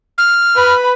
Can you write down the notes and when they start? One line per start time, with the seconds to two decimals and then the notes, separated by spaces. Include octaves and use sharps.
0.18 F6
0.55 B4 B5